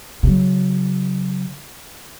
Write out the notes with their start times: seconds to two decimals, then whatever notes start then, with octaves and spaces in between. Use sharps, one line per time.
0.23 C#3 F#3